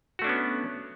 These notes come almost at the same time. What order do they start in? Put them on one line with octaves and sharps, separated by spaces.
F#4 A3 D4 C#4 B3